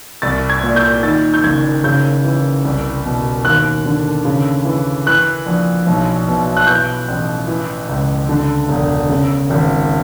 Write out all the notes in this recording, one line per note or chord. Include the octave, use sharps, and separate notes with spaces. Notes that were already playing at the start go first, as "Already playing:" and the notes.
C2 A6
G#6
A#2
G6
D#3 A6
G6
F#1 G#6
C#3 G6
E3
C2
B2
D#2 F#6
D3
C#3
E3
E3 F#6
A#1
B1
B2
F#6
E3 G6
A1
E3
C#2
D3
E1
C#3
G#1